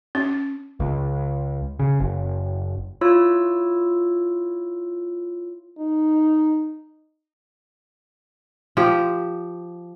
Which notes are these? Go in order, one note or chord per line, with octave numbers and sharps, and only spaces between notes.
C#4
C#2
C#3
F#1
E4 F4 C#5 E6
D#4
F3 G4